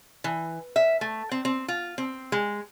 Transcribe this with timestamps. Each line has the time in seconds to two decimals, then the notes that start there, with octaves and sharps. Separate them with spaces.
0.24 E3
0.76 E5
1.01 A3
1.31 C4
1.45 C4
1.68 F4
1.98 C4
2.32 G#3